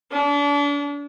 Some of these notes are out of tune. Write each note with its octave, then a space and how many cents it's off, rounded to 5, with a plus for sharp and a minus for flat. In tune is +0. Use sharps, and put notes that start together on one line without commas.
D4 -35